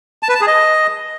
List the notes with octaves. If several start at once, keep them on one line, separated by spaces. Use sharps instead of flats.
A5
B4
A5
G#4
D#5